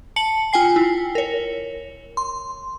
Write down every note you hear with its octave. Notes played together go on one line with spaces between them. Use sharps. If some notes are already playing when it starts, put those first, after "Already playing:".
A5 C#7 F#7
F4 G5 G#5 C7
E4
A#4 C#5
C6